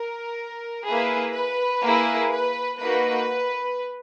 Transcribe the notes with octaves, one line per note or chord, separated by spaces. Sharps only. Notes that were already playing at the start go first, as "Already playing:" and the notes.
Already playing: A#4
A#3 E4 G#4 B4
B4
A#3 E4 G#4
B4
A#3 D#4 F#4 B4